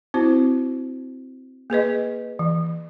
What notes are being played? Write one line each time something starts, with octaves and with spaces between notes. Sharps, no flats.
C4 E4 F#4 C5
A#3 G#4 B4 D#5
E3